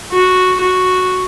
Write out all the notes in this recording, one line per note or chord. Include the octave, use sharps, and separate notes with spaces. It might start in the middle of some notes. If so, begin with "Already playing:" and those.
F#4
F#4